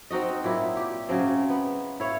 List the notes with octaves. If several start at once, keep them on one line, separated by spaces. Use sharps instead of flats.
C4 D#4 F#4 D#5
A#2 F#3 E4
G4
C#3 F#3 C4
B3
E4 C#5 F5